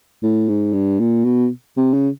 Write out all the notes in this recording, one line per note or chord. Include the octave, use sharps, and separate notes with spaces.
A2
G#2
G2
A#2
B2
C3
C#3